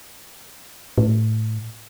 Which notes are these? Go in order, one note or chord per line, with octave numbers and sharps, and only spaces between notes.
A2